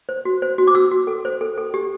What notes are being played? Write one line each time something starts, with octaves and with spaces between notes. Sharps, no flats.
C5
F#4
C5
F#4
D6
F#4 E6
F#4
A4
C5
A4
A4
G4